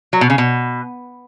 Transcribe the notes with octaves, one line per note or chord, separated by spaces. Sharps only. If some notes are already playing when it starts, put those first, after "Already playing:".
F#3
B2
C#3
B2